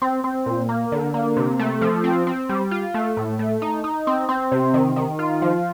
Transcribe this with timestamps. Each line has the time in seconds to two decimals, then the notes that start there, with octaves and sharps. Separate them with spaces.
0.02 C4
0.24 C4
0.46 A#2
0.69 A#3
0.92 D3
1.14 A#3
1.37 C3
1.59 A3
1.81 F3
2.04 C4
2.27 C4
2.49 G3
2.71 F4
2.94 A3
3.17 A2
3.39 A3
3.62 D#4
3.84 D#4
4.07 C4
4.29 C4
4.52 C3
4.74 D#3
4.96 D#3
5.19 F4
5.42 F3